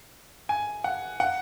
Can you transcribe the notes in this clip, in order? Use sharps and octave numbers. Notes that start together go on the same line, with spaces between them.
G#5
F#5
F#5